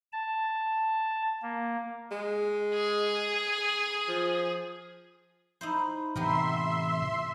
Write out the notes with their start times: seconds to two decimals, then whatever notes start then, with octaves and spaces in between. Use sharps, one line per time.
0.13 A5
1.42 A#3
2.11 G#3
2.74 G#4
4.08 F3
5.61 D#4 E4 C5
6.15 A2 C3 E3 B3 G4 A#4 E5 C6